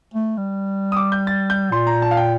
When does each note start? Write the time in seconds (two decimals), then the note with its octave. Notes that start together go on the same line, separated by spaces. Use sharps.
0.14 A3
0.37 G3
0.92 D#6
0.97 D6
1.12 G6
1.27 A6
1.50 G6
1.72 A#2 C6
1.87 A#5
2.02 A5
2.11 F5
2.17 G5